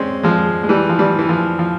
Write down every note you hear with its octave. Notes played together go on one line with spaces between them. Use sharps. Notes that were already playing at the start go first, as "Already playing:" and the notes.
Already playing: G#3 C4 C#4
F3 G#3
G#3
E3 G3
F3
E3 G3
E3
F3
F3